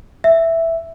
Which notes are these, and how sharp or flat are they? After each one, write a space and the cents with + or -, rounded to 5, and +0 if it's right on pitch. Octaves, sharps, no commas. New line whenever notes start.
E5 +0